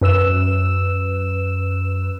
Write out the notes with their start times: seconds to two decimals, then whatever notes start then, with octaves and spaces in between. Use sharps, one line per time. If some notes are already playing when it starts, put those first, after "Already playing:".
0.01 F#2 B4 E6 E7